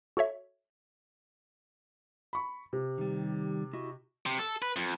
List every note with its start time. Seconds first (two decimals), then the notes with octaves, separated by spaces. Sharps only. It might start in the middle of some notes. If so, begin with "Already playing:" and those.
0.17 F#4 A4 C#5 E5
2.33 B5 C#6
2.73 C3
2.98 D#3 G3
3.73 E4 F#4 D#5
4.26 C3
4.39 A4
4.62 B4
4.76 F2